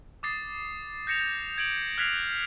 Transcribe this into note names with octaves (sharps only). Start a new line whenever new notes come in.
D6 D#6 A6 C7
G6 A#6 C#7 E7 F7
G6
G#6 D7 F#7
F6 F#6 G#6 B6 C7 F7